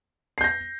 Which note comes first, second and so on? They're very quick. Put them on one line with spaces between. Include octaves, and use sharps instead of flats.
C7 G6 A#6